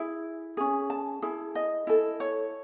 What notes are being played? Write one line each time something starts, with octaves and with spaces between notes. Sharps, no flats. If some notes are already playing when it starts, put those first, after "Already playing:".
Already playing: E4 G#4
C#4 G#4
A5
E4 G#4
D#5
E4 A4
C#5